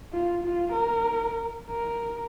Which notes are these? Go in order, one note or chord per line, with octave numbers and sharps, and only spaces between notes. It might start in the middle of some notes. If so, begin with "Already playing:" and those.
F4
F4
A#4
A#4